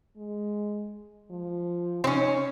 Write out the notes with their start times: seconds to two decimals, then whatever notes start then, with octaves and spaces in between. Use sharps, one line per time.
0.17 G#3
1.31 F3
2.04 C4 C#4 D#4